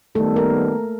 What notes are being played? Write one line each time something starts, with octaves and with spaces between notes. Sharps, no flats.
D#3 G3 A3 B3 A4
A#3 A#4